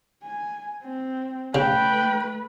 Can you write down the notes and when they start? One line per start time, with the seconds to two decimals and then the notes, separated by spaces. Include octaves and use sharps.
0.23 G#5
0.83 C4
1.55 C#3 A3 B4 G5